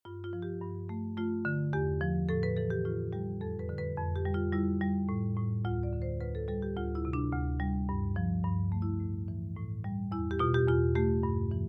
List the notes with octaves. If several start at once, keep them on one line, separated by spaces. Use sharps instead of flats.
G2 F4
F4
F3
G4
G2
A3
A3 F4
D3
E2 G4
F3
A2 A4
B4
E3 A4
G4
A2 F4
G3 G4
F2 A4
B4
D3
B4
F2
G4
G3
F4
G3 E4
G3
A2
A2
D2 F4
D5
D3
C5
D2 B4
A4
G3 A4
G4
D2 F4
E4
C3
D4
D2
G3
G2
F3
G2
A3
E4
A2
E3
A2
G3
E2 E4
G4
B2 F4
G4
E2 F4
A3 G4
G2
E3